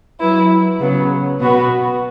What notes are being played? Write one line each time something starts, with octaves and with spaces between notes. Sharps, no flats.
F#3 E4 B4
C#3 F#3 B3
B2 B3 F#4 B4